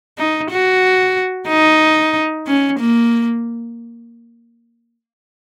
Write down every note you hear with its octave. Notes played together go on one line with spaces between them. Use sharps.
D#4
F#4
D#4
C#4
A#3